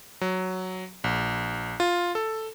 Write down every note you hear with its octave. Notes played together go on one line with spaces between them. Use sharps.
F#3
A#1
F4
A4